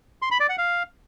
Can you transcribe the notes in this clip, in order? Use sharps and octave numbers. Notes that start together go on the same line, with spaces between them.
C6
B5
D5
F#5
F5